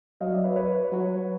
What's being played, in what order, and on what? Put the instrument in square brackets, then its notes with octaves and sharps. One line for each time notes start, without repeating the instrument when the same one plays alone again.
[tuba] F#3 [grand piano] D#5 F5
[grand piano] D5 E5
B4 C#5
B4 C#5
[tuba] F#3